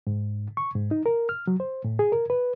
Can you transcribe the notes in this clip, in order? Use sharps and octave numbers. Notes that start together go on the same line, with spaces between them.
G#2
C#6
G#2
D#4
A#4
F6
F#3
C5
A2
G#4
A#4
B4